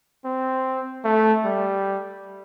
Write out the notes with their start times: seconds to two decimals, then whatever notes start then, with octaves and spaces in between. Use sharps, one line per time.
0.25 C4
1.05 A3
1.45 G3